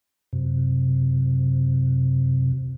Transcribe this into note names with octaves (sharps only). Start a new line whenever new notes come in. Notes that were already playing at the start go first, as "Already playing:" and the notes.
F#2 C3